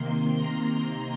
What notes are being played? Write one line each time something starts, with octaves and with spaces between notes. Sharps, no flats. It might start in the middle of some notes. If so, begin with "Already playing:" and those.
Already playing: C3 D#3 A#3 C6
A#5